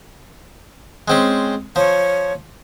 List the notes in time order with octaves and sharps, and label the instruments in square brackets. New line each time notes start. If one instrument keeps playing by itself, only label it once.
[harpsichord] G#3 C4 C#4
[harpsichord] F3 [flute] C#5